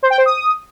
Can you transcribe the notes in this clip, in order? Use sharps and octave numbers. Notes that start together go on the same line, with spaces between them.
C5
G5
C5
D#6